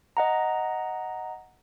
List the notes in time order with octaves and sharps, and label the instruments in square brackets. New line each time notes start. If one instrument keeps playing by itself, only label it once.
[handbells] D#5 F#5 A#5